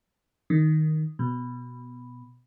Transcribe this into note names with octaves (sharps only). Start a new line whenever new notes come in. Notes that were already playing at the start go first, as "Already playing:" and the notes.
D#3
B2